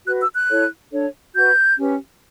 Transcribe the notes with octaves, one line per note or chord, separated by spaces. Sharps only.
F#4 B4 F#6
E6
F#6
E4 A4 C#5
D4 A4 C#5
F#4 B4 G6
C#4 G4 B4